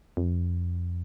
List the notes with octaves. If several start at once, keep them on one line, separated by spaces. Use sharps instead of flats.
F2